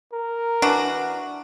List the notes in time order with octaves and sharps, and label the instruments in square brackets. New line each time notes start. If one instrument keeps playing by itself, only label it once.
[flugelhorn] A#4
[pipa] E3 D4 F#4